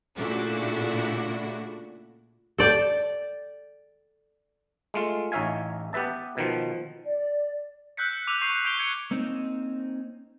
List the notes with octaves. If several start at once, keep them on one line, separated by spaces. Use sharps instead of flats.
A#2 C#3 A3 D4 E4 F#4
A4 D5 G5
G#3 A3 F4
A1 D#4 C#5 E5 F5 G#5
B3 G4 B4 E5 A5
B2 D#3 F3
D5
E6 F#6 G6 B6 C#7
C#7
D6 E6 F#6 D#7 F7
C#6 G6 C7 D#7
C#6 G6 D7 F7 G7
G#6 C#7 D7
A#3 C4 C#4 D#4